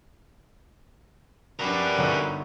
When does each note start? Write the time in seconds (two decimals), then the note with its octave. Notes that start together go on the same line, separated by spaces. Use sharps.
1.59 G3 D4 F#4 A#4 B4 C#6
1.98 G1 F#3 D#4 E5